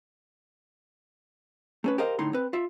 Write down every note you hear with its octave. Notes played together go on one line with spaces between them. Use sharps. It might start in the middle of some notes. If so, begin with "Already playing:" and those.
A3 C#4 B4
G4 A#4 C5 D#5 F5
A2 D3 D#4 C6
C4 B4
F4 E5